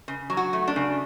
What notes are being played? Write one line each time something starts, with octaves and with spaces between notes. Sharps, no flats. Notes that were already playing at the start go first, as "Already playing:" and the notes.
C#3
F#3
F#4
A3
D4
C#3